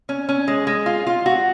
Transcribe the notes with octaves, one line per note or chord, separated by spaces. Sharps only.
C#4
C#4
G#3
G#3
F4
F4
F#4